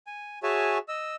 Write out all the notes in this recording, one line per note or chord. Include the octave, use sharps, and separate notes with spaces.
G#5
F#4 G#4 C#5 E5 G#5 A5
D#5 E6